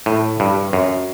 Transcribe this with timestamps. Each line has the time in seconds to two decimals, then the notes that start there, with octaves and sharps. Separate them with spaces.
0.06 A2
0.40 G2
0.73 F#2